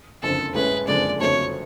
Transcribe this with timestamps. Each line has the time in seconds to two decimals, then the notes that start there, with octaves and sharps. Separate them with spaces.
0.22 F#1 F2 D3 A4
0.55 A1 A2 G#3 C#4 B4
0.87 F#1 F2 D3 G#3 D5
1.20 F#1 F2 D3 F#3 A3 C#5